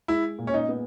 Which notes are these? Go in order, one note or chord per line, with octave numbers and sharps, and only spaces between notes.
G#3 E4
A#2
C#4
D#4
B3